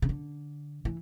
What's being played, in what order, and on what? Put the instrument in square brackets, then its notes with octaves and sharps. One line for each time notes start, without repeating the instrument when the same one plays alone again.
[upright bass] C#3
D3
E3